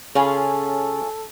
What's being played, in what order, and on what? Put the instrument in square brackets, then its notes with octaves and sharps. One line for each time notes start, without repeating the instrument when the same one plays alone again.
[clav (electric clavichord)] C#3 [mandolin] C#4 F4 G#4 [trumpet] A4